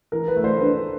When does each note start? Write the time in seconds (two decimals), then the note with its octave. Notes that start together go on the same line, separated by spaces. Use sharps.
0.12 E3 A#4
0.28 B4
0.36 A3
0.44 C5
0.61 D4 B4